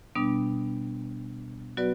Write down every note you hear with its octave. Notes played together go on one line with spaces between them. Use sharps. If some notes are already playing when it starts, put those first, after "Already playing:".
B2 G3 B3 D4
F#3 B3 F#4 B4 D5